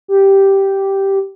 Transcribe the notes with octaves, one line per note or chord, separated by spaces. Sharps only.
G4